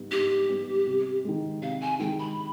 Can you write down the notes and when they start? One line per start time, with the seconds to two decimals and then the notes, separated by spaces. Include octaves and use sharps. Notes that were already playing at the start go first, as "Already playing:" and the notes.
Already playing: G#2 G3 B3
0.11 G#2 G4
0.49 G3 B3
0.87 C3
1.25 D#3 G#3
1.62 C3 F5
1.81 G#5
1.99 D#3 G#3 G5
2.19 B5